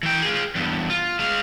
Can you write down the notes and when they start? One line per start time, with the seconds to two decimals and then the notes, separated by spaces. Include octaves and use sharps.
0.03 E3 G5
0.22 F4 G#4
0.55 E2 G2
0.90 F4
1.19 G#3 F5